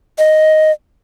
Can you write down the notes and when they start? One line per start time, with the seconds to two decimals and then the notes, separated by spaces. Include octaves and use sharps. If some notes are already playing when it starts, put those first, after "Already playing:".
0.18 D#5